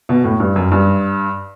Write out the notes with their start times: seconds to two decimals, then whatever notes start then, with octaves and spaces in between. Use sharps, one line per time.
0.09 B2
0.24 A2
0.40 G2
0.56 F#2
0.72 G2